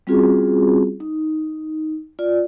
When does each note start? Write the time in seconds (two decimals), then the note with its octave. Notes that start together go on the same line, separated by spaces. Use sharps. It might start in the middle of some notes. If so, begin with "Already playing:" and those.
0.07 G3 C4 C#4 F4 F#4 G#4
1.00 D#4
2.19 F4 D5